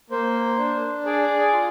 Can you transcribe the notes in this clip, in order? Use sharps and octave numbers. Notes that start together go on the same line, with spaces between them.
A#3 C5
D4
G#4 D5
F4